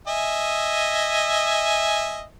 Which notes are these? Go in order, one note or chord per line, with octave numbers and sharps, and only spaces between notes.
D#5 E5 G#5